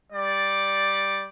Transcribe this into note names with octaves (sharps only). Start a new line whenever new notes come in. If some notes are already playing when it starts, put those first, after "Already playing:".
G3 D5